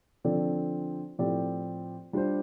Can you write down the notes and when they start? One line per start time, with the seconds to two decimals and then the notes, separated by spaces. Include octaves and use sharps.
0.24 D3 F3 C4 A4 D5
1.19 A2 F3 C4 G4 D5
2.13 G3 D4 F4 C5